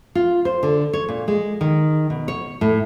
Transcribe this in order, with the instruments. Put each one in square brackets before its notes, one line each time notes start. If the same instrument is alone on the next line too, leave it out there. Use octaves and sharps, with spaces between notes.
[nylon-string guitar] F4
C5
D3
C#5
A#2
G#3
D#3
B2
C#5
A2